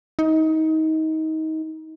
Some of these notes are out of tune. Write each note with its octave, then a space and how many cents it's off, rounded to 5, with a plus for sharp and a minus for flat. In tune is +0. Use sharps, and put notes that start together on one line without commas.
D#4 +25